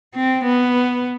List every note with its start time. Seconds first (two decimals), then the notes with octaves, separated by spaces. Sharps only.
0.15 C4
0.44 B3